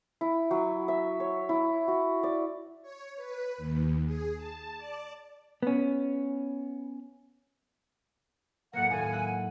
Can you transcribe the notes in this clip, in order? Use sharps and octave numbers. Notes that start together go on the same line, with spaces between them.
E4
F#3
E5
C#5
E4
F#4
D5
C#5
B4
D#2
G#4
A5
D5
B3 C#4
A2 F#3 A#3 F#5
D#2 A2 G#5
F#5 E6 F#6